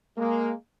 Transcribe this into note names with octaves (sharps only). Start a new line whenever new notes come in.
G#3 A#3